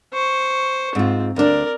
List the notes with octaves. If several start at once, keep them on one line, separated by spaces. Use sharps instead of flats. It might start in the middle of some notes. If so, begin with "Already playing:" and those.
C5 C#6
G#2 C4 F4
D2 D4 A#4 D5